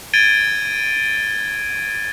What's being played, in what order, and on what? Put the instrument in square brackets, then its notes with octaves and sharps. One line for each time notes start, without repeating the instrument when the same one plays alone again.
[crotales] G#6 A6 D7 D#7 G7